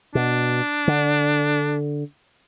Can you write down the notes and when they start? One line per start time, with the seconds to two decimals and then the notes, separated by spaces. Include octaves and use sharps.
0.15 B2 D4
0.88 D3